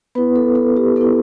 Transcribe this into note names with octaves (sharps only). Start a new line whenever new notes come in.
B3 E4 B4
A4
A4
G4
B3 E4 A4